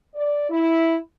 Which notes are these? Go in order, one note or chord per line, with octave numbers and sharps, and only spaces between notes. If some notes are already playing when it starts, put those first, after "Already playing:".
D5
E4